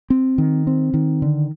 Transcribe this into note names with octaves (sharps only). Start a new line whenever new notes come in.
C4
D#3
C4
D#3
D3